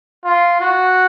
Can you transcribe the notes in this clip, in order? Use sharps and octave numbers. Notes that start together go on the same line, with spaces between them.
F4
F#4